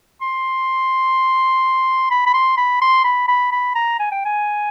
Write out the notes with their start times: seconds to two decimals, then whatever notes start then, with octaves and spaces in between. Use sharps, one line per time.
0.21 C6
2.11 B5
2.27 B5
2.34 C6
2.58 B5
2.81 C6
3.04 B5
3.28 B5
3.52 B5
3.75 A#5
3.99 G#5
4.12 G5
4.25 G#5